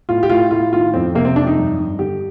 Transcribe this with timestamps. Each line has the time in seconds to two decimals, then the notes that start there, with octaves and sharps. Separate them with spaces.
0.09 A2 F4
0.23 G4
0.30 A2 F4
0.51 A2 F4
0.73 D#3 F4
0.94 F2 C4
1.15 C3 A#3
1.25 C4
1.36 F2 D4
1.47 D#4
1.57 G2
1.79 G2
1.99 D3 G4